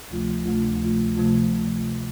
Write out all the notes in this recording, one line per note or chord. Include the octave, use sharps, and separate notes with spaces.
D2 C3 F3 A3 F4
D2 C3 F3 A3 F4
D2 C3 F3 A3 F4
C3 F3 A3 F4